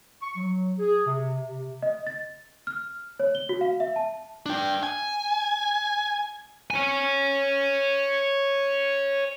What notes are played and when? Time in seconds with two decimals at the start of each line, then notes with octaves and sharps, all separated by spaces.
0.21 C#6
0.36 F#3
0.79 G#4
1.07 C3
1.45 C3
1.82 D#5
2.07 A6
2.67 F6
3.20 C#5
3.35 G7
3.49 F#4
3.61 F5
3.80 E5
3.96 A5
4.46 D4 G5
4.83 G#5
6.71 C#5 G#5